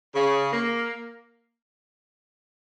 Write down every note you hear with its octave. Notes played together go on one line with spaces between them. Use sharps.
C#3
A#3